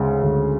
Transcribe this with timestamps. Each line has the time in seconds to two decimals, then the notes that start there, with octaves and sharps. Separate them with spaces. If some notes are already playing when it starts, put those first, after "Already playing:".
Already playing: D2 C#3 G#3
0.22 D2